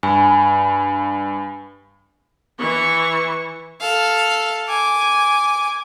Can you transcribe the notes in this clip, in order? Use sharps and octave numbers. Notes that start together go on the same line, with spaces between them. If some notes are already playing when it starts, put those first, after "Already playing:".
G2 G#5 B5
E3 C#6
A4 F5
G#5 D6